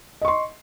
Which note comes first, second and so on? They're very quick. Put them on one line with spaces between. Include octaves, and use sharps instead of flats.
D#5 C#6 C6